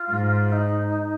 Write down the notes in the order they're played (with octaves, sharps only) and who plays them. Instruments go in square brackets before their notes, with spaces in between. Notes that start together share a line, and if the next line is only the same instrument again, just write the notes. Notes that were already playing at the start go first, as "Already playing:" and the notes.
Already playing: [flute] F4
[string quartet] G#2
[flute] D#4